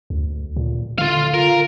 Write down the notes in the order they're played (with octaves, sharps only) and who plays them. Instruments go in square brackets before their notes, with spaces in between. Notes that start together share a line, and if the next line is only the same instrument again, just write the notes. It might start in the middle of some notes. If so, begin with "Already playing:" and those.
[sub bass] D2
A#2
[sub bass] D3 [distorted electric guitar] F4 F5
[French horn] F4 [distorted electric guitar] A#4